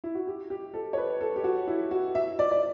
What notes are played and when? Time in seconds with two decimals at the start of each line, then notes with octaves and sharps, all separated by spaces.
0.04 E4
0.15 F#4
0.27 G4
0.50 G4
0.74 A4
0.93 C#5
0.98 B4
1.21 A4
1.36 G4
1.44 F#4
1.67 E4
1.91 F#4
2.15 E5
2.39 D5
2.51 D5